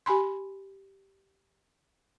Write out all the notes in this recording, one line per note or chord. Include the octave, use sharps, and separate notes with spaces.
G4 G#5 B5 C6